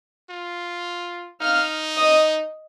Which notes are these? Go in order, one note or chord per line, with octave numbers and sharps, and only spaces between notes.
F4
D#4 F5 F6
D#5 D#6